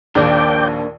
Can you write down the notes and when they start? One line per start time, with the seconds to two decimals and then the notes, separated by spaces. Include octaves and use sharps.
0.15 A#1 D#2 A#3 D4 D5 G5